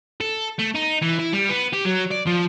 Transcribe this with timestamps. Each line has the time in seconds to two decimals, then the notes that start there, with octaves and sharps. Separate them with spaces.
0.21 A4
0.59 A3
0.75 D#4
1.02 E3
1.19 E4
1.33 G3
1.50 B3
1.73 G4
1.85 F#3
2.11 D5
2.27 F3